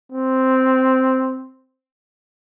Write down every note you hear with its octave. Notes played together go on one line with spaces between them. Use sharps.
C4